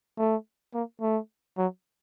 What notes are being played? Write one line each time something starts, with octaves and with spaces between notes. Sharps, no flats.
A3
A#3
A3
F#3